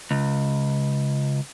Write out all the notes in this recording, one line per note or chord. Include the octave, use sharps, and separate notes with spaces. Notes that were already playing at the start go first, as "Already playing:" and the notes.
C#2